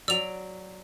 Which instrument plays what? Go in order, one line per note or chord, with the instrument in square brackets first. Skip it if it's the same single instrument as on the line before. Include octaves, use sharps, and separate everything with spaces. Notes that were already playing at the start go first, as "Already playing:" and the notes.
[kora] F#3 D5 [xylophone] E6 F7